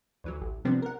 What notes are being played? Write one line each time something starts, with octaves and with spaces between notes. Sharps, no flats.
D2 E3 F#3
A1
C3 F3 G3 B3 C4 D4
A#4 F#5